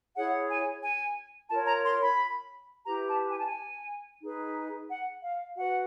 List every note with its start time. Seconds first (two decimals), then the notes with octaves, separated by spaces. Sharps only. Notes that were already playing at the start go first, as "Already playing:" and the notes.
0.15 E4 G#4 C#5 F#5
0.49 G#5
0.83 G#5
1.50 F4 A#4 C#5 A5
1.67 A#5
1.84 C6
2.01 B5
2.85 E4 G4 B4 A#5
3.08 A5
3.30 G#5
3.38 A5
3.46 G#5
4.21 D#4 G#4 B4
4.88 F#5
5.22 F5
5.56 F#4 B4 F#5